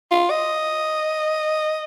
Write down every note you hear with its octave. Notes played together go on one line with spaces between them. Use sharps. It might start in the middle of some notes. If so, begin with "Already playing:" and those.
F4
D#5